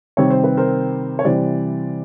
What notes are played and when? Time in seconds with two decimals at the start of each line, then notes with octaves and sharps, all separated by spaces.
0.17 C3 D#3 G3 C4 C#5
0.30 C5
0.44 B4
0.57 A#4 C5
1.19 C#5
1.25 C3 E3 G3 C5 D5